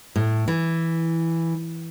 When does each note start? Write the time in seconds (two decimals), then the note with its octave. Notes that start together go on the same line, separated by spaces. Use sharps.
0.16 A2
0.48 E3